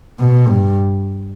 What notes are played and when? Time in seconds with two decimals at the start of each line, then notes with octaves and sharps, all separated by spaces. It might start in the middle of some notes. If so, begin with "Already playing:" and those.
0.20 B2
0.48 G2